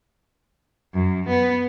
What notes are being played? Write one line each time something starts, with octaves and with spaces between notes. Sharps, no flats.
F#2
B3